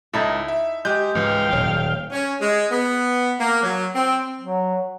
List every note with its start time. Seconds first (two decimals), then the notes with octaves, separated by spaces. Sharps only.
0.14 C#2 D#4 E4 A4
0.48 E5
0.85 G#3 G4 G6
1.15 C#2 G#2 E3 F5 G5
1.52 D#1 F#3
2.11 C#4
2.41 G#3
2.71 B3
3.39 A#3
3.63 F#3
3.95 C4
4.41 F#3